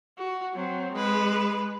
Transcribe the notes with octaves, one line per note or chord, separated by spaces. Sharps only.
F#4
F#3 C4
G#3 B4